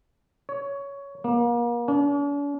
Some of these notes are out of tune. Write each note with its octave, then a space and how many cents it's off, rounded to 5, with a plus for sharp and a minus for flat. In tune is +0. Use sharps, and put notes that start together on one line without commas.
C#5 +15
A#3 +35
D4 -45